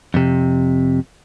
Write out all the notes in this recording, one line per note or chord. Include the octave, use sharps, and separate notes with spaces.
F2 C3